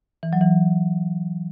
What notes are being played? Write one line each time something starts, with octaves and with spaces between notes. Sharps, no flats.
E3
F#3
E3